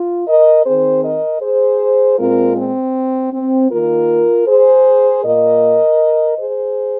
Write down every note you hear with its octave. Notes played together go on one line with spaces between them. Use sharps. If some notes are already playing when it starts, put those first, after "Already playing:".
Already playing: F4
A#4 D#5
D#3 C4 G#4 C5
A#4 D#5
G#4 C5
A#2 G#3 C4 F4 A#4
C4
C4
D#3 A#3 F4 A#4
G#4 C5
A#2 A#3 A#4 D#5
G#4 C5